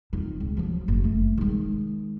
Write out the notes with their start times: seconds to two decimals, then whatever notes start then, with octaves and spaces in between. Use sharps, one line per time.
0.13 F2 D#3
0.40 C#2
0.57 F3 F#3
0.88 F#1
1.04 A3
1.38 D#3 G#3